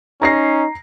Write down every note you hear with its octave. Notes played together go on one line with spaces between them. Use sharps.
C#4 D#4 A#5 A#6 C7